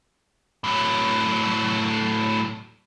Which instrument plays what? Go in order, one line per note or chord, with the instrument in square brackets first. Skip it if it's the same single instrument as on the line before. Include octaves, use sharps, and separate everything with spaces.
[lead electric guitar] A2 F#3